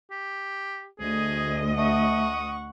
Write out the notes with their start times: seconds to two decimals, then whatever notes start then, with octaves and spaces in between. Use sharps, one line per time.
0.11 G4
0.99 D2 G#4 D#5
1.77 A3 F#5 C#6 D#6